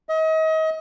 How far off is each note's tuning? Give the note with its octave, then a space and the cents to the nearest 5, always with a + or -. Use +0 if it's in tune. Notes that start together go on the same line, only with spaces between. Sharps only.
D#5 +35